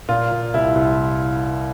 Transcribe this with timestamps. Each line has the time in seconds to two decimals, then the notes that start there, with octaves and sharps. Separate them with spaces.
0.09 A#2 F4
0.31 A#2
0.54 C2 E4
0.75 C2